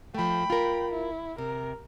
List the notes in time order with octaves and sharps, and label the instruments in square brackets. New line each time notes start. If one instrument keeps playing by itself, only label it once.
[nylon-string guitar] F3 A3 [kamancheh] G5 B5
[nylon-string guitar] F4 A#4
[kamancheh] E4
[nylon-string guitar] C3 [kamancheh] A#4